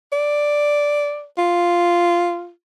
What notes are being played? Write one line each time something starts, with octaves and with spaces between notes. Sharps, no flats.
D5
F4